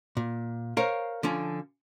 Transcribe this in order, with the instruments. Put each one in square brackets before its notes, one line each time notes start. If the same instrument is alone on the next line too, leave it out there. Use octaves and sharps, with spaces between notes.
[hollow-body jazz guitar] A#2
A#4 C5 C#5 F5 A#5
D3 F3 C#4